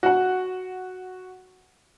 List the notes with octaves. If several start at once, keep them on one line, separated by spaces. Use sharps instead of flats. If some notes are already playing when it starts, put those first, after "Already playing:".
F#4 F#5